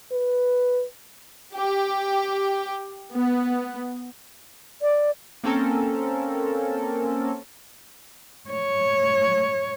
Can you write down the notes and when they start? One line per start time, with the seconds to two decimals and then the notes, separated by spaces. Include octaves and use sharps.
0.12 B4
1.54 G4
3.14 B3
4.82 D5
5.44 A#3 C4 C#4 A4 A#4
8.50 C#5